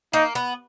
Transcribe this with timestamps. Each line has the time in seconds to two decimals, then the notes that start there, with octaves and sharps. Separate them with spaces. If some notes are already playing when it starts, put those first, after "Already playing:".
0.13 A#3 D#4
0.35 B3